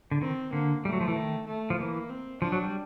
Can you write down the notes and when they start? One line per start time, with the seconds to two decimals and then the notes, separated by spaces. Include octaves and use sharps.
0.11 D3
0.21 D#3 C4
0.52 D3 A#3
0.85 G3 A3
0.93 F#3
1.01 F3
1.08 E3
1.16 D#3
1.47 A3
1.70 F3
1.79 E3 A#3
2.10 C4
2.42 F3 D4
2.52 F#3
2.63 G3